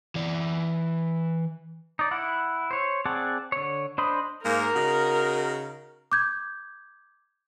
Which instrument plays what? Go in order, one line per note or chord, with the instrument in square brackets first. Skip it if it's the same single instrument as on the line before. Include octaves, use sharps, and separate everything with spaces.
[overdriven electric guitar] E3 D5
[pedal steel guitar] D#4 D5
E4 F#5
C5 C#5
C4 G#4 D5 F#5 A5
D3 C#5
D4 C5 D#5 B5
[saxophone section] G#2 A#3 [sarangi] A#4
[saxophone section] C#3 D#4 F#4
[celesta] D6 G6 G#6